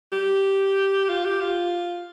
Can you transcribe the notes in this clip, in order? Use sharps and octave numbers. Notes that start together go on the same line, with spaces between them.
G4
F4
G4
F4